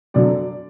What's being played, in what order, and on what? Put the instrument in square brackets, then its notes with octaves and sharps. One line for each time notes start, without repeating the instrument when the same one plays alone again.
[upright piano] F#2 D3 F#3 D5